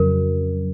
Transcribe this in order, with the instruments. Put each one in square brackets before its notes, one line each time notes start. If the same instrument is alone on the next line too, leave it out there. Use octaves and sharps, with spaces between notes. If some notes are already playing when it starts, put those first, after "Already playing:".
Already playing: [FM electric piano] F2 C#3 F#3 [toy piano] A#4